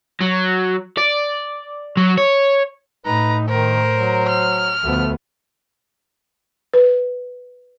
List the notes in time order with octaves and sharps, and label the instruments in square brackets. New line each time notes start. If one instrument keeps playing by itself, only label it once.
[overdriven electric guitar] F#3
D5
F#3
C#5
[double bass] A2 [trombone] D#4 [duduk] B4 [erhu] A#5
[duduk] D#3 [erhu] A#4 [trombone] C5
[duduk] F#3
[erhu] F6
[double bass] D2 B3 [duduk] F3 [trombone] A3
[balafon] B4